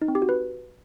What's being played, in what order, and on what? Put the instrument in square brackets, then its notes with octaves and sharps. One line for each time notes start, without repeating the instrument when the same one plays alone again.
[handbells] D#4
C4
G4
F#4
B4